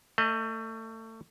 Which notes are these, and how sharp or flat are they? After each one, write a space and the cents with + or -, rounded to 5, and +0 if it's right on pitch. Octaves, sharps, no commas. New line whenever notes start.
A3 +30 D#5 +0